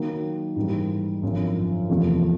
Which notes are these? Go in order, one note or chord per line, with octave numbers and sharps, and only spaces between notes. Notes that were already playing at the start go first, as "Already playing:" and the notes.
Already playing: D#3 F#3 A#3
G#2 E3 G3 A#3
G#1 F#2 D3 F3
E2 C3 F3 A3